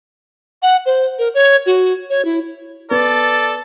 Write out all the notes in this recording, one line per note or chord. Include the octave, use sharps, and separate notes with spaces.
F#5
C5
A#4
C#5
F#4
C#5
E4
B3 A4 D5